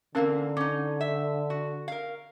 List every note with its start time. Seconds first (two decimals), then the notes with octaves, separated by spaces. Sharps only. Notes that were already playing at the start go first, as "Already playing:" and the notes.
0.15 D3 E3 A#3 C4 C#4 A#4 F5
0.57 C#4 D#4 D6
1.01 E5
1.50 F#4
1.88 A#4 F5